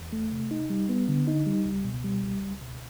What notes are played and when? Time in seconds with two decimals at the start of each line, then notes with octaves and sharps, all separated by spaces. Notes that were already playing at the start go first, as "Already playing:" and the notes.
Already playing: E2
0.13 A3
0.32 C3
0.51 D#4
0.70 G3
0.89 B3
1.08 D3
1.27 D#4
1.46 G3
1.65 C#2
1.84 B2
2.04 G3
2.22 C#2
2.42 C#2
2.61 B2